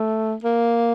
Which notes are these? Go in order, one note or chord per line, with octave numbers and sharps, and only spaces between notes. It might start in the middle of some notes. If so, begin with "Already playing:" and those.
Already playing: A3
A#3